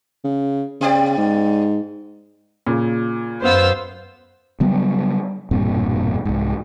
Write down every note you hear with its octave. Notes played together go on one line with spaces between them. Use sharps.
C#3
C#3 B3 G4 D5
G#2
A#2 C#3
F#2 B3 C5 F5 E6
C#3 F#3 G3 B3
E1 G2 A#2 C4
C2 G#2